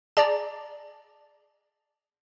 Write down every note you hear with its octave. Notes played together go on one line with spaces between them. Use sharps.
G#4 D5 A5 A#5